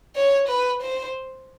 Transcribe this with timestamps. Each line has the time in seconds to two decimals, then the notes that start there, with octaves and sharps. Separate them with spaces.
0.16 C#5
0.48 B4
0.82 C5